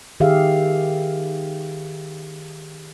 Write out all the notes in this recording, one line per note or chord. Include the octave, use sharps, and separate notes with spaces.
D#3 G4 G#4 E5 F5